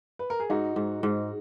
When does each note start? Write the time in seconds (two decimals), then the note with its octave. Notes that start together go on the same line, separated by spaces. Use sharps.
0.19 B4
0.30 A#4
0.40 G#4
0.50 G#2 D#4 F#4
0.76 G#2
1.03 G#2